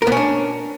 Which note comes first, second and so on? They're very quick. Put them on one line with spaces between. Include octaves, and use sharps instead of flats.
A#4 B3 C#4 D4